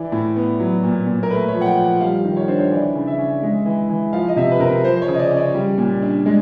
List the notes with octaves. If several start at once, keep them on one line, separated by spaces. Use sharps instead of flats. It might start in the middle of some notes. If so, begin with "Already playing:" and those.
Already playing: E3 D5
A2
B3
F#3
A#2
A#2
A#4
A3 B4
C#5
F3
F#5
G5
F3
F#5
G3 F5
D#3
C#5
D4 C5
C#5
E3 D5
C#3
E5
C#4
G#3
E3
E3
F3 F5
D#5
C3 E5
B4
C3 A#4
F3 C5
C5
C#5
C#3
D#5
D5
C#4
D5
G3
A#2
D4
G#3